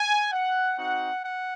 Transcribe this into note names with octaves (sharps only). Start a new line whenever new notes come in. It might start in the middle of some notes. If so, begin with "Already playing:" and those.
Already playing: G#5
F#5
C4 D#4 F#4 F#5
F#5